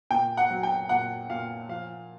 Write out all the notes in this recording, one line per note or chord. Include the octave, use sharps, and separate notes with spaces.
A#2 G5
F#5
F#3
G5
A#2 F#5
A#2 F5
F3 F5